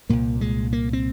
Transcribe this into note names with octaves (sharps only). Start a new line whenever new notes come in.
C2 A#2 A#3
G#3
A#3
C4